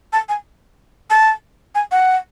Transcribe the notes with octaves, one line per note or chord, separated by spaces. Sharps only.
A5
G#5
A5
G#5
F#5